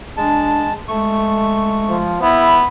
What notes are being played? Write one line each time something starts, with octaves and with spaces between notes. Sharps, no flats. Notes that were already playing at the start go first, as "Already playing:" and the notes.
G#3 D4 A5
G#3 A3 C#6
F3
B3 E4